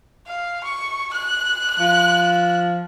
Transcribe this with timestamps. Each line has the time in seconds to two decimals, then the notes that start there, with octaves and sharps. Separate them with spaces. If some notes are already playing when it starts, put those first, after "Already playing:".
0.27 F5
0.64 C#6
1.13 F#6
1.80 F3